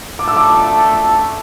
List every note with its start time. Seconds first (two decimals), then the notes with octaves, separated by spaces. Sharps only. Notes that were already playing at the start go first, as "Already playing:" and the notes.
0.19 A3 D4 A4 D6
0.28 E6
0.37 D6